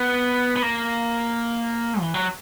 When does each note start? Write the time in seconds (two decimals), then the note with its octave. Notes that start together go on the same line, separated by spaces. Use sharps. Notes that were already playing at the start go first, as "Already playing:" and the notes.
Already playing: B3
0.56 B3
0.62 A#3
2.00 E3
2.14 F#3